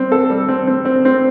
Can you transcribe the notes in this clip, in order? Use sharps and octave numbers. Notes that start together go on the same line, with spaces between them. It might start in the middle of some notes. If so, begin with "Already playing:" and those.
Already playing: G3 C4
A4
G3
C4
C4
C4
C4